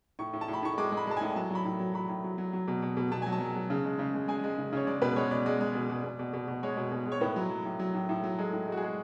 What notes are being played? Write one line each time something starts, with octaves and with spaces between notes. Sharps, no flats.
A2 C#6
A2
A5
A2
B5
A2 C#6
G#3 D6
G#3
B5
G#3 A5
A2 G#5
F#3 A5
F#3 B5
A2
F#3
F#3 B5
A2
F#3
F#3
F#3
B2
B2
B2
B2 A5
F#3 G#5
A5
F#3
F#3
C#3
G#3
C#3
G#3
G#3 G#5
G#3
C#3
C#3 C#5
G#3 D5
B2 B4
G#3 C#5
B2 D5
G#3 D5
G#3
B2
B2
B2
B2
B2
B2
G#3 C#5
B2
B2
G#3
C#5
A2 B4
F#3
F#3
A2
F#3
A2
A2
F#3
G#3 A4
A2
G#3 F#4
G#3 G#4